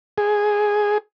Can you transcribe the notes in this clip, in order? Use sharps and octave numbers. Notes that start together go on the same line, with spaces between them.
G#4